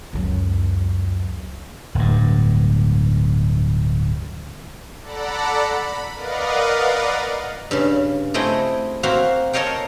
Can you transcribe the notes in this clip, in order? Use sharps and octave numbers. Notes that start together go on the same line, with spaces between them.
C#2 F#2
D1 G2
A4 D5 F#5 A#5 B5
B5
A#4 B4 D5 D#5 F5 F#5
G2 C#3
A3 C4 E4 G#4 D#5 G5
A#3 C4 F#4 E5 F5
A4 A#4 C#5 D#5 F5 G5